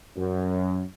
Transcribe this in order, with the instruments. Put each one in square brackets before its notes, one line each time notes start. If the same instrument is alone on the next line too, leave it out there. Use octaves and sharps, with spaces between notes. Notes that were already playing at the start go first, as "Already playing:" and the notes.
[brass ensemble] F#2